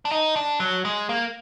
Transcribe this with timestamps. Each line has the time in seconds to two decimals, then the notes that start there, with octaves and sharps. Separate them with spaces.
0.05 D4
0.11 D#4
0.36 D4
0.60 F#3
0.85 G#3
1.09 A#3